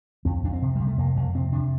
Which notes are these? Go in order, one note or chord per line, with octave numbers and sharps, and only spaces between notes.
F2 C4
F2 D4
C4
C3
C3 G3
A3
F2 A#3
F2 A#3
C3 C4
C3 D4